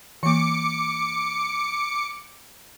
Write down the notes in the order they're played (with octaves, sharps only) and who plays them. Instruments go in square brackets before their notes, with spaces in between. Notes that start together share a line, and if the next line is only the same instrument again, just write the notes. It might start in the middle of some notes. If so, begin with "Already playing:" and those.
[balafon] E3 A#3 [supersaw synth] D6 C#7